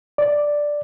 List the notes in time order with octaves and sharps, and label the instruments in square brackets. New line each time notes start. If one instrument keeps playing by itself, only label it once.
[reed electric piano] D5